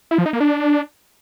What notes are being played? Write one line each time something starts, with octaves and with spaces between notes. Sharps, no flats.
E4
F3
D#4
A#3
D4